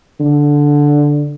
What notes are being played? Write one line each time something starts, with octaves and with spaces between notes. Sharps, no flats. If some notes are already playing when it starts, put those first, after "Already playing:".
D3